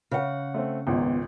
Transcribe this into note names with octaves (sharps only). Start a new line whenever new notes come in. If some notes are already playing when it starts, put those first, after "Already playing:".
C#3 F#5
A3 C4
G#1 C#2 A#2 B3